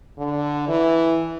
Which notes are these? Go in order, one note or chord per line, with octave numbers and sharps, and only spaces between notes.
D3
E3